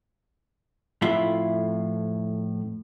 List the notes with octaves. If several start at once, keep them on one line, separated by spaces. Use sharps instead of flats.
F2 A2 E4 F4 E5